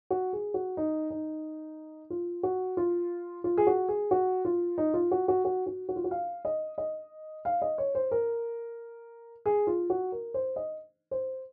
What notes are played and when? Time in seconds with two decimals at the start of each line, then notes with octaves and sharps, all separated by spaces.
0.10 F#4
0.33 G#4
0.54 F#4
0.77 D#4
1.10 D#4
2.10 F4
2.43 F#4
2.77 F4
3.44 F4
3.57 G#4
3.67 F#4
3.88 G#4
4.11 F#4
4.45 F4
4.78 D#4
4.94 F4
5.11 F#4
5.28 F#4
5.45 F#4
5.67 F#4
5.89 F#4
5.96 F4
6.04 F#4
6.11 F5
6.45 D#5
6.78 D#5
7.45 F5
7.62 D#5
7.78 C#5
7.95 C5
8.11 A#4
9.46 G#4
9.67 F4
9.90 F#4
10.12 A#4
10.34 C5
10.56 D#5
11.11 C5